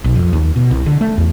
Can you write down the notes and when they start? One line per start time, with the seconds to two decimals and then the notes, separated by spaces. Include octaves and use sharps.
0.04 B1
0.16 F2
0.33 D#2
0.56 B2
0.71 C2
0.86 D3
1.01 A3
1.18 E2